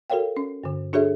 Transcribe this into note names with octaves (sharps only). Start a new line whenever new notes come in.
F#4 A4 A#4 C#5 F5 G5
C#4
G2 D3
D4 F#4 G#4 A4 C#5 E5